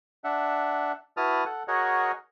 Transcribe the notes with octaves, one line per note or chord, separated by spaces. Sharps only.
D4 E5 F#5
E4 F#4 B4 A5 D#6 F6
A4 F#5
F#4 G#4 A#4 C#5 D#5 F#5